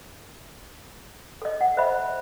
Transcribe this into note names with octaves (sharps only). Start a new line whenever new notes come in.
A4 D#5
F#5
C5 D#5 E5 B5